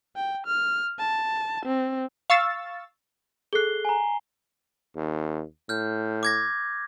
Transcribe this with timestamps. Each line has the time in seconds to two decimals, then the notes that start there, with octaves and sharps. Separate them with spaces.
0.16 G5
0.47 F6
0.99 A5
1.66 C4
2.30 F5 C#6 E6 A6
3.53 G#4 A4 F#6 C7 G7
3.85 G#5 A#5
4.96 D#2
5.69 A2 F6 G6
6.23 D6 G#6 A#6